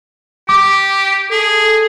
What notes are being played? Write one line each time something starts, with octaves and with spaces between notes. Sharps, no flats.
G4 D6
G#4 A4